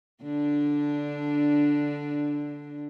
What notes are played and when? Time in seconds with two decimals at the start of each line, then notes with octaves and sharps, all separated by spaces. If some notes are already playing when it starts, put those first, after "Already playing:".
0.23 D3 D4